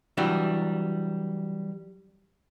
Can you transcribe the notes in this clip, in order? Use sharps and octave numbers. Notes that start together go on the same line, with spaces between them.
E3 F#3 G3 D4